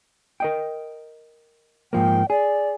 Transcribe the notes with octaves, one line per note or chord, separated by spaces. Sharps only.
A#4 D#5 G5
G#2 F3 A#3 G5
G#4 D5